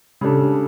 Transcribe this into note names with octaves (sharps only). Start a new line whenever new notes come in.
C#3 G3 D4 A4